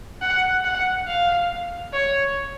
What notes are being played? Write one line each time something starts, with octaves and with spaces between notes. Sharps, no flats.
F#5
F#5
F5
C#5